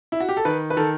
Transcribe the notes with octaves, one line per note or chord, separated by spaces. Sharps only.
E4
F#4
G4
A4
D#3 B4
B4
D#3 A4